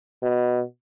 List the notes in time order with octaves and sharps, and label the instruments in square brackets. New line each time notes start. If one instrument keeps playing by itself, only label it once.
[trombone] B2